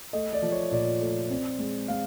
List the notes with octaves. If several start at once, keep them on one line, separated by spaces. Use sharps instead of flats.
A3 D#5
D5
F3
C#5
A#2 D5
A3
C4
G#3
G#3 F5